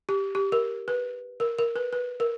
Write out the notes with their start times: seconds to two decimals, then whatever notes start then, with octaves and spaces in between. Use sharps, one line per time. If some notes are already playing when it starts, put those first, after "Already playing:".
0.09 G4
0.35 G4
0.52 A#4
0.88 B4
1.40 A#4
1.59 A#4
1.76 B4
1.93 B4
2.20 A#4